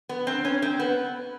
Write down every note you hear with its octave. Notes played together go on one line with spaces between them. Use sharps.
B3
C4
C#4
C4
B3